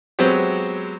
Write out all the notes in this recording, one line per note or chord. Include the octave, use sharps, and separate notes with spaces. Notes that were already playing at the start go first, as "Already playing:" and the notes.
F#3 G#3 B3 C4 G4